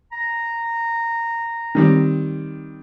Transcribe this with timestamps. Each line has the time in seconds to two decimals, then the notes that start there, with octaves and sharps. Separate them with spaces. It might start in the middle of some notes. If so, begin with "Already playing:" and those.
0.12 A#5
1.75 D#3 G3 C4